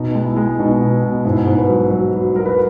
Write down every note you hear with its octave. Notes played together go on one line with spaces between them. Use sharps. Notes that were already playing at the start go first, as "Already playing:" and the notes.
Already playing: B2 D#4
G#3
E4
G#3
B2 D#4
B2
B2
G#2 E4
G#2
B4
F#3
F#3 B4
F#3
F#3 A#4
B4